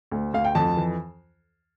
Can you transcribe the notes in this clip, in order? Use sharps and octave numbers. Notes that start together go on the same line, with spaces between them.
D2
D2 F5
G5
F2 A5
E3